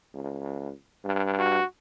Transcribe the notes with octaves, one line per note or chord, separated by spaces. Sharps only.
C#2
G2
F#4